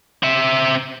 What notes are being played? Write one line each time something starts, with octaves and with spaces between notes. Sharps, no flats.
C4 E5